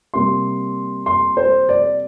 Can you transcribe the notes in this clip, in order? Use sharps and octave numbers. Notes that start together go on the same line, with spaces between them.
C3 G3 A#3 C6
C6
C5
D5